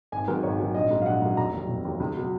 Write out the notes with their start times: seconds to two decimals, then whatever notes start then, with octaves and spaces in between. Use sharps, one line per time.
0.12 G#1 G#5
0.28 G#2 D#3 F#3 A#4
0.43 G#1 C#5
0.60 G#2 D#3 F#3
0.75 A#1 D#5
0.91 G#2 F#3
1.02 F5
1.06 A#1 F#5
1.22 G#2 F#3
1.37 F1 A#5
1.53 D#2 D#3 F#3
1.69 F1
1.85 D#2 D#3 F#3
2.00 C#2
2.16 B2 F#3